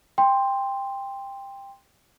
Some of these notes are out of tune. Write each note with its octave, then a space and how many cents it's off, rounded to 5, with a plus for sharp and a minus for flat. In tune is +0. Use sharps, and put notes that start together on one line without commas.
G5 +15 C6 +0